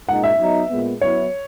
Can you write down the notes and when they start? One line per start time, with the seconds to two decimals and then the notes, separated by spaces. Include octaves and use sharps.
0.08 A#2 G#3 D#4 F#5
0.24 E5
0.39 F#3 B3 D#4
0.70 A#2 G#3 B3
1.01 F#3 B3 E4 C#5